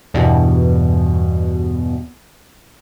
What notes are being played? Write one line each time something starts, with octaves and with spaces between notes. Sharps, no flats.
E2 G2 B2